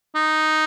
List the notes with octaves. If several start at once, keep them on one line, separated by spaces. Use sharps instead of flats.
D#4